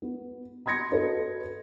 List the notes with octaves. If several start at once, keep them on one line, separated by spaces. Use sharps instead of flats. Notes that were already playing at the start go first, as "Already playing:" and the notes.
B3
B5 C6 G#6 A#6 C#7
F#4 A4 B4 D#5